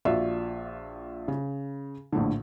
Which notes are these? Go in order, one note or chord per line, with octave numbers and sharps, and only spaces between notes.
A#1 F4 F#4 D5 E5
C#3
A#1 A2 D3